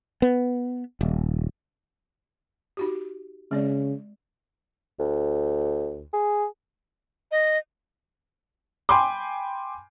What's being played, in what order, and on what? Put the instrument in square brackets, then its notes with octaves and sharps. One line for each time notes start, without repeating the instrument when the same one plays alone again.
[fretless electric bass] B3
D#1
[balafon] D#4 F#4 G4
[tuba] C#3 [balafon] G#3 C4 D5
[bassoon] D2
G#4
[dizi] D#5
[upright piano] G5 G#5 B5 C6 D6